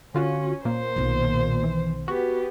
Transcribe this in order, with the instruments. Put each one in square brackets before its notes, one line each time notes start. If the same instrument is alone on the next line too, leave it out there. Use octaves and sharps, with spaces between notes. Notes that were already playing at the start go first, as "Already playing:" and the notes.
[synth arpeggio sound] D3 F4 F#4 [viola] C#4
[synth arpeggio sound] A#2 A#3 [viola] C5
[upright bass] B1 D#3
[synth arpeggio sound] E3
[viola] B3 G4 [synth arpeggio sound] F#4